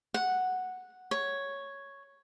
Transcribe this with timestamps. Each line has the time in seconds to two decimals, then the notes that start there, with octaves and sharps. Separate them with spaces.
0.14 F#5
1.11 C#5